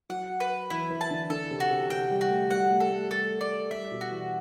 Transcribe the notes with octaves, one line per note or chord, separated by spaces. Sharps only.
F#3 F#5
B4
E3 E4
E3
A5
D3
D3 A4
C3
F#4
C3
C3 G5
G3
F#4
A3
G3 F#5
A3
A4
A3
G3 A4
D5
G3 E5
B2
F#4
E3